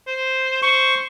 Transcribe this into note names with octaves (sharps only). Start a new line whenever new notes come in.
C5
C5 C#6